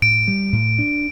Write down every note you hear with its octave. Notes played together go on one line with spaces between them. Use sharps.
A2 D7
G3
A2
D4